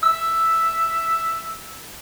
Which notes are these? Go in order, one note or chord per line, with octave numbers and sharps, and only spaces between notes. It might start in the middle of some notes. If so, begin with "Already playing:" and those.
E5 E6